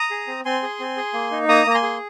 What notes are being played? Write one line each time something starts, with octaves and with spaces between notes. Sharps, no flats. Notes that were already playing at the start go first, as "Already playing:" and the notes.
Already playing: A#5 D#6
G#4
C4
C4 G#5 C6
G#4
C4
G#4
A#3
D#4
A#3 A#5 D#6
A#3 A#5
G#5 C6
G#4